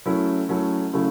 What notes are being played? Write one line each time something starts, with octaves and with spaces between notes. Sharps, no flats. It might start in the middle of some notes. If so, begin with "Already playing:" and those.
F#3 A3 C#4 E4
F#3 A3 C#4 E4
C#3 F#3 A3 C#4 E4